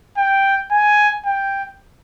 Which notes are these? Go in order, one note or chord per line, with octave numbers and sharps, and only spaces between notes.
G5
G#5
G5